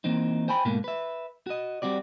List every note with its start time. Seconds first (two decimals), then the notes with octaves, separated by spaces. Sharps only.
0.04 E3 A#3 C4 D#4
0.48 C5 G5 G#5 B5
0.65 G#2 B2 A3 A#3
0.84 B4 E5
1.47 F#4 D#5
1.82 G3 C4 F#4 D5